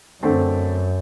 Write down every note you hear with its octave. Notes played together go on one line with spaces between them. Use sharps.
F#2 D3 A3 C4